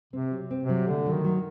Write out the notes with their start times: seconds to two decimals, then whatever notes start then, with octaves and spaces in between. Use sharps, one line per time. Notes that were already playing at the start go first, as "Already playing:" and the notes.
0.13 C3 C4
0.31 F#3
0.51 C4
0.63 C3
0.69 F#3
0.87 D3 A3
1.06 F#3
1.12 D#3
1.24 F#3